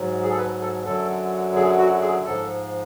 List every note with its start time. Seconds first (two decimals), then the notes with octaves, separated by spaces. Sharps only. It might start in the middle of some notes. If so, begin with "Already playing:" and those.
Already playing: G#2 F#3
0.23 G#4
0.31 A4
0.38 B4
0.61 A4
0.85 F#2 D3 F#3 A4
1.56 G#4
1.78 F#4
2.02 G#4
2.25 G#2 F3 A4